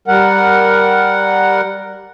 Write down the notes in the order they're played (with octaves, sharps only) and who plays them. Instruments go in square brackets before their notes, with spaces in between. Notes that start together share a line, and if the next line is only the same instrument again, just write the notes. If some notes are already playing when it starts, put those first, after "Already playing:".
[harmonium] G3 A#4 F#5